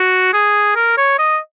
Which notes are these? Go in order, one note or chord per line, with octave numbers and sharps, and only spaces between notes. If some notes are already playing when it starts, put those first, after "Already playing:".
Already playing: F#4
G#4
A#4
C#5
D#5